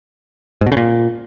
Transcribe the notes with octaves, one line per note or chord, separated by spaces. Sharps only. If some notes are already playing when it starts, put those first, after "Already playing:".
G#2
B2
C#3
A#2